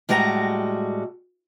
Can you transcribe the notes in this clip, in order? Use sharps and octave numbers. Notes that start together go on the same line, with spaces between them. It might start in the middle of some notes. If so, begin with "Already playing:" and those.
A2 G3 G#3 F#4 A4 A#5